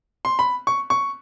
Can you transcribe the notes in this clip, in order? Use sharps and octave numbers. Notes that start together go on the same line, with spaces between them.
C6
B5
C#6
C#6